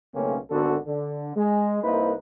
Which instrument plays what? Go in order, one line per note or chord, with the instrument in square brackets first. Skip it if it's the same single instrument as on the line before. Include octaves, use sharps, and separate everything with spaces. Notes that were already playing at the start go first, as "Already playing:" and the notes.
[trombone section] B1 C#3 A3 A#3 C4 C#4
G#1 D3 B3 F#4 A4
D3
G#3
C2 A#3 D#4 E4 B4 C5